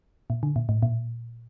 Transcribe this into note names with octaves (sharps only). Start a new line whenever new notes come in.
A#2
D3
A#2
A2
A#2